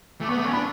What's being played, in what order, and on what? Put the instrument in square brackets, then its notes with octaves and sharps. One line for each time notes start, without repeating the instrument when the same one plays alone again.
[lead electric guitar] A3
[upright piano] D6
[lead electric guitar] B3 [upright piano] C#6
[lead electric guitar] A3 [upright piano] D6
[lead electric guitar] C#4 [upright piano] C#6
[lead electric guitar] D4 [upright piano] B5